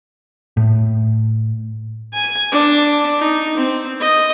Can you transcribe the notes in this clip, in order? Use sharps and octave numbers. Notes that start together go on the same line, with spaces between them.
A2
G#5
D4
D#4
C4
D#5